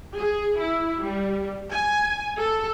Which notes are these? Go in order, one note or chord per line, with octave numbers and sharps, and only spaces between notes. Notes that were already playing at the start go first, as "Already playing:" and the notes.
G#4
E4
G3
G#5
A4